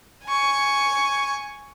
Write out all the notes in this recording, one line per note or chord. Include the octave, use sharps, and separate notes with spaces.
G#5 C#6